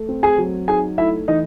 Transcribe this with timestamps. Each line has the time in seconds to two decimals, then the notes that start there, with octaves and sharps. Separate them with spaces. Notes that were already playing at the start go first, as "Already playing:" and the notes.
Already playing: A3
0.09 C4
0.23 G#4 G#5
0.38 F#3
0.68 D#4 G#4 G#5
0.98 A3 E4 E5
1.28 E3 D#4 D#5